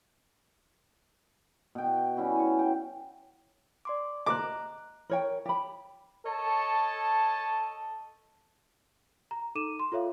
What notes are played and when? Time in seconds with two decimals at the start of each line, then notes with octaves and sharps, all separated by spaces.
1.75 B2 G5
2.17 G3 C#4 E4 F#4
2.36 C#5 G#5
2.59 G5
3.85 D5 C6 D6
4.26 D#5 A#5 D6 F#6
5.10 A#4 C#5 G5
5.46 G4 B5
6.25 A4 C#5 D#5 A5
9.31 A#5
9.55 D#4 A4 D6 D#7 E7
9.79 C6
9.92 F4 A4 C#5 E5 F5